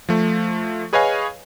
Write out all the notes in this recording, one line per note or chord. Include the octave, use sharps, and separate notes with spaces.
F3 A3
G#4 B4 C#5 D#5 F5 G#5